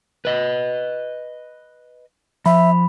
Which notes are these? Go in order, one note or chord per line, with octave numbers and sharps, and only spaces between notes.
B4 D#5
F3 E5 B5